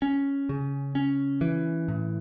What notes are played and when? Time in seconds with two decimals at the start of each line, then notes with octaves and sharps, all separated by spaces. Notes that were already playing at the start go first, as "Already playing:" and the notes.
0.02 C#4
0.49 C#3
0.95 C#4
1.41 E3
1.88 A2